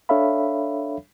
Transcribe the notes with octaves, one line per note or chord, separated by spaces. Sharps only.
D4 A4 C#5 E5 F5 B5